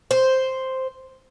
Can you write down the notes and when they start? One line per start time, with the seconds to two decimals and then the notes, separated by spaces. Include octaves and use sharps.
0.11 C5